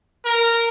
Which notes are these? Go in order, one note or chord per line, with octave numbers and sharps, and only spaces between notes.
A#4